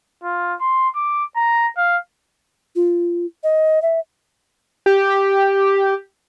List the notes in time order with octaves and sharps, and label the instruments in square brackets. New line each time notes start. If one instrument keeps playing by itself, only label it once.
[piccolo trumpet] F4
C6
D6
A#5
F5
[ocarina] F4
D#5
E5
[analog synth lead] G4